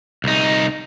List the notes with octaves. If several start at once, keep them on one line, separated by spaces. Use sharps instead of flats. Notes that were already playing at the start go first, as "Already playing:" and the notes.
C2 D#4